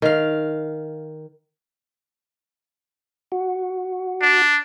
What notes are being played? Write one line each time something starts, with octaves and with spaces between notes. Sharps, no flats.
D#3 F5
F#4
D4